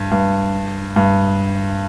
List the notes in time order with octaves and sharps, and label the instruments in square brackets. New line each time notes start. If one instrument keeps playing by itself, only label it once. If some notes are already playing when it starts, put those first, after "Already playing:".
Already playing: [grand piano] G2
G2
G2